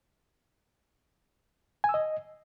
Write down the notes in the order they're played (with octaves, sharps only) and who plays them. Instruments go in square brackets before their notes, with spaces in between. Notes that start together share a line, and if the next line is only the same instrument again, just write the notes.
[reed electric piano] G#5
E6
D#5